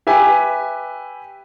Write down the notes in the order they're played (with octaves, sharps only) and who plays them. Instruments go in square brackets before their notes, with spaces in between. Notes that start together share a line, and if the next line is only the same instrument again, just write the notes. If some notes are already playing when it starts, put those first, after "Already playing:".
[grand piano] G4 B4 E5 G#5